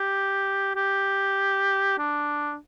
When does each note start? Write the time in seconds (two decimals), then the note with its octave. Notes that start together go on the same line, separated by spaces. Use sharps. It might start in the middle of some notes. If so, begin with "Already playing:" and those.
Already playing: G4
0.75 G4
1.98 D4